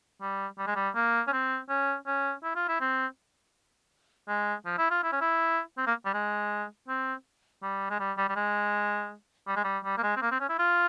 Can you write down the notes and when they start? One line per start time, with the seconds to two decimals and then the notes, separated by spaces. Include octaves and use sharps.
0.21 G3
0.58 G3
0.67 G#3
0.75 G3
0.95 A#3
1.28 C#4
1.33 C4
1.69 C#4
2.07 C#4
2.43 E4
2.56 F4
2.68 E4
2.81 C4
4.28 G#3
4.66 F3
4.78 E4
4.91 F4
5.03 E4
5.12 C#4
5.21 E4
5.77 C4
5.87 A#3
6.05 G3
6.14 G#3
6.88 C4
7.62 G3
7.91 G#3
8.00 G3
8.18 G3
8.29 G3
8.36 G#3
9.48 G3
9.56 G#3
9.64 G3
9.84 G3
9.98 A#3
10.03 G#3
10.16 C4
10.22 A#3
10.31 C4
10.40 C#4
10.49 E4
10.59 F4